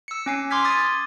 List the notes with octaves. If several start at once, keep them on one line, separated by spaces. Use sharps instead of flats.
E6 C#7
C#4 G#5 C7
C6 D6 F6 G#6 B6
D#6 A6